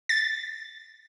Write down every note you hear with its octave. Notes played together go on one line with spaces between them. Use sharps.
A6